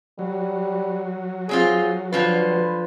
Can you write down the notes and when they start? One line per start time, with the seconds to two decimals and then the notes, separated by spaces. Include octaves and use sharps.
0.19 F#3 G3
1.49 G#3 C4 F4 G#4
2.13 D3 F3 F4 B4